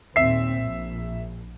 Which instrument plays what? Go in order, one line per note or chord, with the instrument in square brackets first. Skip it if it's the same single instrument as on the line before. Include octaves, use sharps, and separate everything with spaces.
[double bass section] D#2 A#2 C4 [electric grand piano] E5 C7
[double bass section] A#1